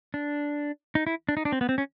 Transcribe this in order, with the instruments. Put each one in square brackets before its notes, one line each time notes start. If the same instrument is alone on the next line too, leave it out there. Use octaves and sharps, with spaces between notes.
[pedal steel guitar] D4
D#4
E4
D4
D#4
D4
C4
B3
C4
C#4